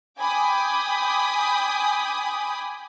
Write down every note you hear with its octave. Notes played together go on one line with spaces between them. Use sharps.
G5 G#5 B5 D6 D#6